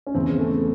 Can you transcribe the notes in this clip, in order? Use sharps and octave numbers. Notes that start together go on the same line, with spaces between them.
C#4
E2 C#3 E3 C4
A3